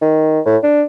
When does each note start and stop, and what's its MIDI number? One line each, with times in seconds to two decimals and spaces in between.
0.02 0.40 51
0.46 0.57 45
0.63 0.83 62